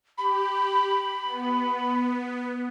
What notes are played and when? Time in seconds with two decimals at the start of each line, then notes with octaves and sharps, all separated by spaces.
0.18 G4 B5
1.24 B3